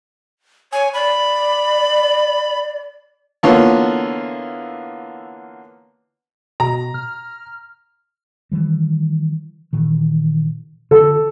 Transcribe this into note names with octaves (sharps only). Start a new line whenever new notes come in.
C#5 G#5
D5 B5
D3 E3 A#3 B3 F4 C#5
B2 A#5
F6
D#3 E3 G3
A#2 D#3 E3
D3 A4